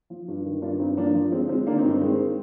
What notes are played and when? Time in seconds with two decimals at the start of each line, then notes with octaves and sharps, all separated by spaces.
0.10 F3
0.28 G2
0.45 D#3
0.62 G2 D4 F4
0.79 G2 C4 D#4
0.97 F3 A#3 D4
1.15 F3
1.32 D3 G#3 C4
1.49 D3 G#3 C4
1.67 D#3 A#3 D4
1.78 C4 D#4
1.84 G2
1.89 C4 D#4
2.01 D#3 G#3 C4